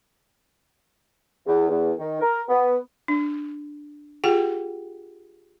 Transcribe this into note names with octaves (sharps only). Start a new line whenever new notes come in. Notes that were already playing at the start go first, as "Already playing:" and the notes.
E2
E2
D#3
A#4
B3
D4
F4 G4 G#4 F#5 G5